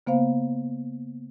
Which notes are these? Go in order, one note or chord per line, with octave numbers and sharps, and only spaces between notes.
C#3 A#3 B3 C5 F5